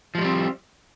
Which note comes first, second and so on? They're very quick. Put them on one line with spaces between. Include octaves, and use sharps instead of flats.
F3 G#3 G3 C4